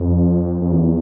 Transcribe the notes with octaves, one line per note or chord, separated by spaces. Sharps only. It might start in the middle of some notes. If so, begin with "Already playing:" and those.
Already playing: F2
F2
E2